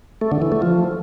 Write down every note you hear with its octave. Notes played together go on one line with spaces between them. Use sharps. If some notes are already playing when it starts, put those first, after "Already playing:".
A3
D3
E3
A3
F3